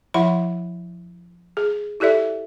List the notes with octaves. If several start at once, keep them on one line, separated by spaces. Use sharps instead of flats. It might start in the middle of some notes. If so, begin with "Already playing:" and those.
F3 E4 E5 F#5 B5
G#4
E4 G4 A4 D5 E5